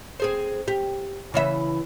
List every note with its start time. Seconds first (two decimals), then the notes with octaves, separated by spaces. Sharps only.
0.20 C4 G#4 C5
0.68 G4
1.34 C#3 E3 E5